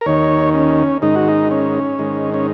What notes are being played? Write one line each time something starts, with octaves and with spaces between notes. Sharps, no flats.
A#4
D#2 D#3 C#5
C#4
G#2 D#3 D#4
F#4
D#4
C#4
G#2 D#3
C#4